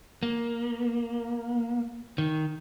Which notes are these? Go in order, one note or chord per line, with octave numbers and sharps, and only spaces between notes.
A#3
D#3